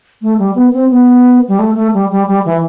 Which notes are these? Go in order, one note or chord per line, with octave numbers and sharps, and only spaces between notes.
A3
G3
B3
C4
B3
G3
A3
A3
G3
G3
G3
E3